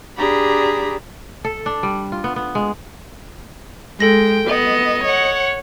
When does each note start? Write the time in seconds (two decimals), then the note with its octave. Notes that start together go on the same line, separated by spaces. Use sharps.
0.17 D4 G4 G#4 A#5 B5
1.44 A4
1.66 D4
1.83 G3
2.12 F4
2.24 B3
2.36 B3
2.55 G#3
4.00 G#3 A4 G5 A#6
4.48 B3 D#5
5.04 C#5 F#5